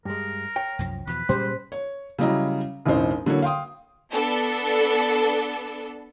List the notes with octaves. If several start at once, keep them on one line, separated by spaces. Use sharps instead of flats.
G2 G#3 A#4
C#5 G5
C2 F#2 F3
E2 B2 F3 B4
A#2 G3 G#3 C#4 C5
C#5
C#3 F#3 G3 E4 D#5 A#5
E1 A1 E3 D#4 C5
D3 F#3 A#3 E4 C#5
F5 G5 C6 D#6
B3 D4 A4